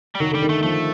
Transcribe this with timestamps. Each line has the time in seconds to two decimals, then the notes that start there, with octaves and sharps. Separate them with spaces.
0.15 G3
0.20 D#3 F#3
0.31 D3 G3
0.42 D#3
0.49 A3
0.63 F3 A3